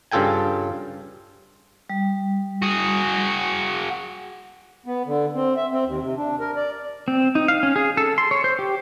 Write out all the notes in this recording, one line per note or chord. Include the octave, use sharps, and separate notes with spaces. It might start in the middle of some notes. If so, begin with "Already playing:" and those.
G2 C#3 F4 A4 G5 G#5
G3
F#4 G#4
B3
D3
C4
E5
C4
D#2
C3
D4
A#4
D5
C4
D#4
F5
C#4
G#4
A4
C6
C#5
C5
G4